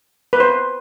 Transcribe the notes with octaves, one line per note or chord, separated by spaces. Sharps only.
B4
C5